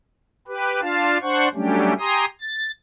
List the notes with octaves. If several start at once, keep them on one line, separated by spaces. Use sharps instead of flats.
G4 B4
D4 F4 F5 A5
D4 C5 F#5 C#6
F#3 G3 A3 C#4 D4 G4
G4 G#5 A#5 C6 D#6
A6